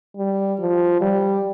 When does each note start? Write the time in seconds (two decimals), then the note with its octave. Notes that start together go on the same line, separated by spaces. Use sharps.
0.17 G3
0.60 F3
1.01 G3